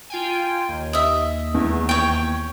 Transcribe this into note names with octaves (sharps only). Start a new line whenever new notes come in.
F4 G5 G#5
D#2
D#5 E5
E2
C#5 G5